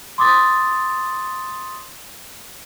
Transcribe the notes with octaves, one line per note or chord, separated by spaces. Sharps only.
C6 D6 D#6 A6